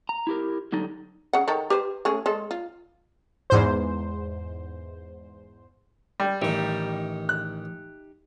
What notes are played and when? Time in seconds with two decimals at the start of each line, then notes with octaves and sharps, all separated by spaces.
0.09 A#5
0.27 E4 G4 A#4
0.72 D3 F#3 G3 D#4 A4
1.33 C#3 F#5
1.48 D#3 A4 A#5
1.70 G4 B4 C5
2.05 A3 C#4 G#4
2.26 G#3 A4
2.51 F4
3.50 E2 G#2 C5
6.20 G3
6.42 A1 D#3 D#4 G4 E5
7.29 F#6